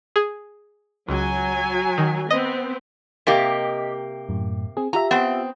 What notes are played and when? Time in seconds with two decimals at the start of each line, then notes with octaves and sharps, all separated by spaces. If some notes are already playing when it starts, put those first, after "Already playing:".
0.16 G#4
1.09 C#2 F#3 G#5
1.98 D#3
2.30 B3 C4 D#5
3.27 C3 A#3 G4 D#5 D6 B6
4.29 F#2 A2
4.77 C4 G#4
4.93 F4 G4 E5 A#5
5.11 B3 C4